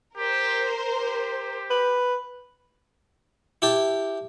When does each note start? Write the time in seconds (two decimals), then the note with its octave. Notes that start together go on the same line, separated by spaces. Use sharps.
0.16 G4 A#4 C5
0.92 G4
1.71 B4
3.62 E4 G4 A5